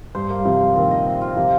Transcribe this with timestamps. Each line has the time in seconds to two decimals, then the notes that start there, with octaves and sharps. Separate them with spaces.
0.15 G2 C5
0.30 A#3
0.39 G3
0.45 C3 F3 C5
0.61 C5
0.76 A#2 D#3 C4
0.91 D#5
1.06 C4
1.21 F4
1.36 C3 F3 A#3